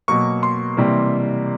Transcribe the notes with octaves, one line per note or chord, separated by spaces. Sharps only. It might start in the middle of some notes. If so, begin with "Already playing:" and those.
B2 F#3 A#3 C#6
C6
C3 E3 G3 A#3